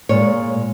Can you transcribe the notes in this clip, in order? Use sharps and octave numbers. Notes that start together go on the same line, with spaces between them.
A#2 G#3 C#5